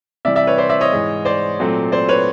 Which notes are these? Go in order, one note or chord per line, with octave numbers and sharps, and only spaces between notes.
C3 E3 G3 D5 E5
D5 E5
B4 C#5
C5 D5
D5 E5
C#5 D#5
G#2 E3 G#3
C5 D5
A#2 F#3 A3 C4
C5 D5
B4 C#5